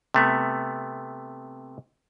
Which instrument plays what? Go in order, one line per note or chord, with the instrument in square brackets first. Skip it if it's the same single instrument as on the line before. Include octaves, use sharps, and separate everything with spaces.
[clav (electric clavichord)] C3 A3 B3